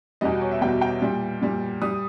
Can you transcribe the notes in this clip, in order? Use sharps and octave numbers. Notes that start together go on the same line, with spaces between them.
E2 B2 G3 D#5
C#5
E5
E2 B2 G3 G5
G5
A#2 G3
A#2 G3
G3 D#6